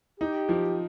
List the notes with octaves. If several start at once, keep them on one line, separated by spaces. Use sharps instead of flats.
D#4 G4
F3